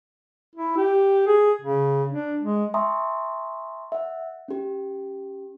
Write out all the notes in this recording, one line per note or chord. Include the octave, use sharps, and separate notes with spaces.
E4
G4
G#4
C#3
D4
G#3
E5 G#5 A#5 C6 C#6 D#6
E5 F#5
C#4 G4